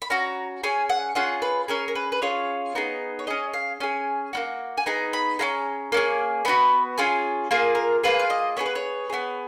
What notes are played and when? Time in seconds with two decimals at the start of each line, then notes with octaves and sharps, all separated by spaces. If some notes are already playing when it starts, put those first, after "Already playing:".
0.02 B5
0.10 C#4 F#4 A#5
0.63 C#4 G#4 G#5
0.90 F#5
1.15 C#4 F4 G#4 F#5
1.42 B4
1.68 C#4 G#4 A#4
1.88 A#4
1.95 B4
2.12 B4
2.22 C#4 F4 G#4 C#5
2.75 B3 D#4 G#4
3.19 C#5
3.27 C#4 G#4 D#5
3.53 F5
3.80 C#4 G#4 G#5
4.33 A#3 C#4 F#4
4.77 G#5
4.86 B3 D#4 G#4 A#5
5.13 B5
5.39 C#4 F4 G#4 A#5
5.92 A#3 C#4 G#4
6.45 B3 D#4 F#4 B5
6.98 C#4 F4 G#4 G#5
7.51 A#3 F4 G#4 A#4
7.75 A#4
8.03 A#3 C#4 F4 G#4 B4
8.19 F5
8.30 D#5
8.57 B3 F4 G#4 C#5
8.66 B4
8.75 C#5
9.10 B3 D#4 G#4